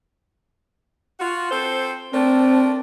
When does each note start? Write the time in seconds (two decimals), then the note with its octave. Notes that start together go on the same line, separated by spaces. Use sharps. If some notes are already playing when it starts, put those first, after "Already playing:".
1.19 F4 F#4
1.51 C4 A4 C5
2.13 A3 C4 D4 A#4